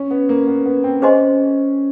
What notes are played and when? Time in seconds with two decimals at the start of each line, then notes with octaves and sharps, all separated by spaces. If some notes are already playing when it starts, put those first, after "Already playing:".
Already playing: C#4
0.11 B3
0.29 A#3
0.47 B3
0.66 B3
0.84 C4
1.02 C#4 G#4 C5 D#5 G#5 C6